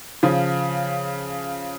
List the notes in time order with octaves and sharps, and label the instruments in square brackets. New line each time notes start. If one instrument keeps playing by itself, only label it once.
[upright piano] C#3 F3